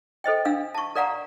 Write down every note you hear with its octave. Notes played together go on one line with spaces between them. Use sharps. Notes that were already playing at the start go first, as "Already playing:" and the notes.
A4 C5 D#5 G5
D4 F5 E6
A5 C#6
A#4 D5 F5 F#5 A#5